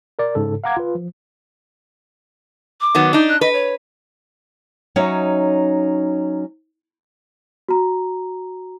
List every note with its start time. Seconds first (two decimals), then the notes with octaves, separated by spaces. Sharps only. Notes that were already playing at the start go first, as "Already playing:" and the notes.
0.19 A#4 D5
0.35 G#2 C#3 A4
0.64 F5 F#5 A#5 D6 G#6
0.77 F4 B4
0.95 F3
2.81 D6
2.95 D#3 F#3 B3
3.13 D4 D#4
3.29 F#6
3.41 B4 D#5
3.53 C#5
4.96 F#3 C#4 D#4 C#5 D#5 E5
7.69 F#4 A#5